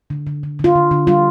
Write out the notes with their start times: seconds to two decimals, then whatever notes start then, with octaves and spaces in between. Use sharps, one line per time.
0.10 D3
0.27 D3
0.43 D3
0.59 D3
0.64 F4
0.76 D3
0.91 D3
1.07 G3 F4